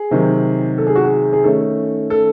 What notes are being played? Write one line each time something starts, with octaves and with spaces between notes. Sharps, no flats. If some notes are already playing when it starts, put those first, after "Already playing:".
Already playing: G#4
C3 D#3 F#3
A4
G#4
F#4
G#4
G#4
D#3 A3 C#4 A4
A4